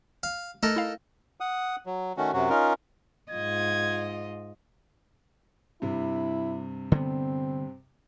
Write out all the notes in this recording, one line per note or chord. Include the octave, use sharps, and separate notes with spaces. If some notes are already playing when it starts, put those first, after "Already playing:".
F5
A3 D#4 A4 A#4
E4 F5
F#5 D#6
F#3
D#3 A3 C#4 F#4
F#2 C3 F#3 F#4
C#4 D#4 F4 A#4
G#2 F4 D#5 G#6
G2 C3 E4
D3 B3 C4